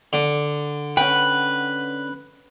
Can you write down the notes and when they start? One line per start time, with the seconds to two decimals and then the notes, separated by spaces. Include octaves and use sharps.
0.13 D3
0.97 C#4 B4 F#5 G5